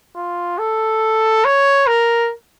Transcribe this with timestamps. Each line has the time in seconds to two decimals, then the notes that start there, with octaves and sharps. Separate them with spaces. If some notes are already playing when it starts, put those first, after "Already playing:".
0.16 F4
0.58 A4
1.45 C#5
1.87 A#4